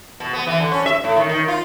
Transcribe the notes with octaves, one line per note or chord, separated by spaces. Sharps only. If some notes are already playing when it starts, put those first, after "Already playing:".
B2
B3
E3
D3
C#4
E5
A2
D#3
D#3
F4